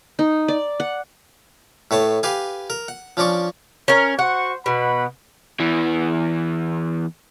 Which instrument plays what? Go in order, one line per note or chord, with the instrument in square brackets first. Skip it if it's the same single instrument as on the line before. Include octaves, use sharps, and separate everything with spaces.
[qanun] D#4
D5
F#5
[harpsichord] A2 B4 C#5 A5
G4 B4 F5 G#5
A#4
F#5
F3 C#4 D4 D5 C#6
[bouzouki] C#4 A#4
[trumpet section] F#4 C5 C#6 [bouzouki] F#5
[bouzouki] B2 [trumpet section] B4 F#5 B5
[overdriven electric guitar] E2 E3